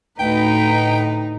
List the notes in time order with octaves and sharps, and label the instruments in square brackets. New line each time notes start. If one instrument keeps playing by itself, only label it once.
[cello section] D2 B4 [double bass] A2 [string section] D#4 [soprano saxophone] G5